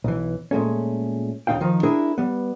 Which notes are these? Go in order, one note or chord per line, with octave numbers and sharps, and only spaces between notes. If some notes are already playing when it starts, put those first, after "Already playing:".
B1 E3
A#2 G#3 A3 C#4
D#2 C#3 C4 D#4 F5 G5
D#3 F3 D#4
D4 E4 G#4 A#4
G3 B3